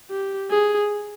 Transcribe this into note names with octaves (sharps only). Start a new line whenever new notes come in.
G4
G#4